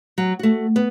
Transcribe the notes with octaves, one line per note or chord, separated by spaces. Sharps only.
F#3
A3 F#4
B3